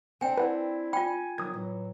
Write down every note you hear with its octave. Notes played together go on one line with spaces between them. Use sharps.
C4 D4 G5 G#5
E4 B4 F#5
F4 G5 G#5 B5
D#3 F3 F#3 B3 D#6 G#6
A2 E3 F#3